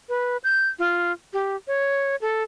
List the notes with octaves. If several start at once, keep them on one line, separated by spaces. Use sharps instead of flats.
B4
G6
F4
G4
C#5
A4